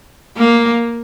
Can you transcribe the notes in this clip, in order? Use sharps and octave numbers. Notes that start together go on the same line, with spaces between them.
A#3